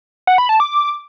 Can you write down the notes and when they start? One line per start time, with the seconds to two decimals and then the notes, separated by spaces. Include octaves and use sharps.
0.27 F#5
0.38 B5
0.49 A5
0.60 D6